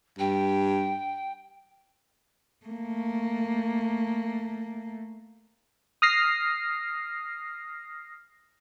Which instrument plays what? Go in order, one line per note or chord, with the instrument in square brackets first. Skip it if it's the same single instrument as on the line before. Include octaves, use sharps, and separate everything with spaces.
[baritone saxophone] G2 [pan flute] G5
[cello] A3 A#3
[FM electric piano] D#6 F6 A#6 C7